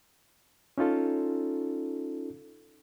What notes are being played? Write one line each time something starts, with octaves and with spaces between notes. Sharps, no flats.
C#4 D#4 F4 A4